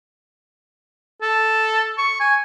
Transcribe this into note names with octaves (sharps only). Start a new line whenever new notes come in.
A4
C#6
G#5